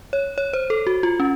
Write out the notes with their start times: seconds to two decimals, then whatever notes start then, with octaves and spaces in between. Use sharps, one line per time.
0.13 C#5
0.38 C#5
0.53 C5
0.70 A4
0.87 F#4
1.03 F4
1.20 C#4